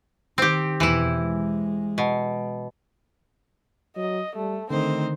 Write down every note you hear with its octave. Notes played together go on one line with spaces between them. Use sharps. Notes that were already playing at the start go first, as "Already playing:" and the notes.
D#3 C4 G4
E2 B2 E3 E4
G#3
B2
F#3 D#5
G3 A3
D3 D#3 A3 C4 D#4 C5